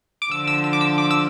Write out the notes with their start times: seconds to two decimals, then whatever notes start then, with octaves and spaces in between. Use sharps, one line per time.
0.22 D6
0.31 D3 F3 E6
0.47 E6
0.64 E6
0.73 D6
0.81 E6
0.98 D6
1.11 E6